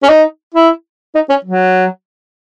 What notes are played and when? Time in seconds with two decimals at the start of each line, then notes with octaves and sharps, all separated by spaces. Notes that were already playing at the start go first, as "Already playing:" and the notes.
0.03 C#4
0.09 D#4
0.54 E4
1.15 D#4
1.29 C#4
1.45 F#3